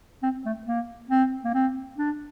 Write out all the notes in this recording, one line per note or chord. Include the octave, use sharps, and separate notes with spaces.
C4
A3
A#3
C4
A#3
C4
D4